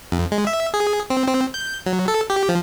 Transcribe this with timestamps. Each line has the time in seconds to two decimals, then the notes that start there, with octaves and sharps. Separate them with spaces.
0.12 F2
0.32 G#3
0.47 E5
0.74 G#4
1.10 C4
1.28 C4
1.54 G6
1.86 F#3
2.08 A4
2.30 G4
2.49 F3